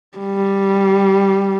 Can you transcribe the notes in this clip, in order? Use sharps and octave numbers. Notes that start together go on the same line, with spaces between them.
G3